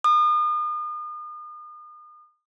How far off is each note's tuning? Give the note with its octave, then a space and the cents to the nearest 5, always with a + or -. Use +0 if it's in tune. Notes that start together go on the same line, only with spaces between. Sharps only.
D#6 -40